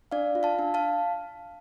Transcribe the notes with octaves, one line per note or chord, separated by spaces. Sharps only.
D4 D5 F5
F4
F5 A5
D4
F5 A5